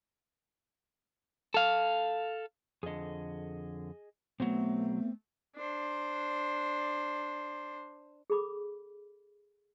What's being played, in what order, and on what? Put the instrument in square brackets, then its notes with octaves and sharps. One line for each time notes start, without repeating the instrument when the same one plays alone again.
[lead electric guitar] A4 F5
[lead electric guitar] F2 D3 [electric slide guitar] G#4 D#5
[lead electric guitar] B1 F#3 [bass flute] A3 [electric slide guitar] B3 C4
[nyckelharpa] D4 C5
[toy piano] G#4 A4 B5 D6